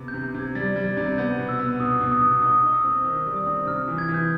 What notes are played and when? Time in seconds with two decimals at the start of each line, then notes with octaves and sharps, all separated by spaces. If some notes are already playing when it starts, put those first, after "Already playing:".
Already playing: C3 B3
0.08 G6
0.14 C3
0.24 G6
0.34 C3 G#6
0.55 G3 A6
0.76 G3 G#6
0.90 G#6
0.97 C3 G6
1.18 B3 G6
1.39 B2
1.49 E6
1.59 B3
1.80 B2 D#6
2.01 B2
2.12 D#6
2.21 B2
2.42 D#4 D#6
2.63 D#4
2.74 E6
2.84 C4
3.04 D#3 D#6
3.26 G3
3.36 D#6
3.46 C4
3.67 C3 F6
3.88 E3
3.98 G#6
4.09 E3
4.14 G6